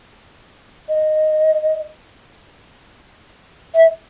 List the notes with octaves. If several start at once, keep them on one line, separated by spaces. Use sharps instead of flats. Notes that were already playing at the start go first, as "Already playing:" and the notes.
D#5
E5